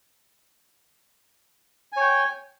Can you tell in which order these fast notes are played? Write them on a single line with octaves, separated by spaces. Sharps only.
G#5 C#5 G5